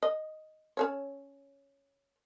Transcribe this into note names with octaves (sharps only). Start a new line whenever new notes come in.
D#5
C#4 A4 C#5